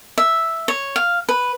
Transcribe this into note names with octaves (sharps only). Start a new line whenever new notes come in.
E5
C#5
F5
B4